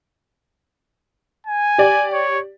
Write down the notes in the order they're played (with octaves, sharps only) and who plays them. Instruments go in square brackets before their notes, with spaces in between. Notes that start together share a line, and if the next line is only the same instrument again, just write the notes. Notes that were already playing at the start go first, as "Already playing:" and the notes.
[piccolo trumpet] G#5
[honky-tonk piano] G4 D5
[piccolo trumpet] C#5